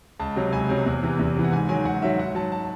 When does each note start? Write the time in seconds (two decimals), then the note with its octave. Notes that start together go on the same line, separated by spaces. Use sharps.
0.19 C#2 A5
0.36 C3 F#3
0.52 C#2 G#5
0.69 C3 F#3
0.86 E2
1.03 C3 E3
1.19 E2
1.35 C3 E3
1.44 F#5
1.52 G#2 G#5
1.69 D#3 F#3 G#5
1.85 G#2 F#5
2.02 D#3 F#3 E5
2.19 G#2 F#5
2.35 F#3 A5
2.52 A5